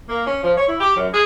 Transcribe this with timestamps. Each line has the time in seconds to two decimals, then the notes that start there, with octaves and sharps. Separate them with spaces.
0.08 A#3
0.25 C#4
0.42 F3
0.56 C#5
0.68 E4
0.80 G4
0.95 F#2
1.13 G#4